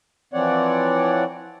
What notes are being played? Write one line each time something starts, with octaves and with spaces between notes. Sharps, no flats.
E3 F3 C4 C#5 D5 F#5